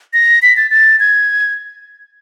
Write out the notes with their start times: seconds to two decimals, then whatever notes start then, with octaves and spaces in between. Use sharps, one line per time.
0.13 A#6
0.42 B6
0.57 A6
0.71 A6
1.00 G#6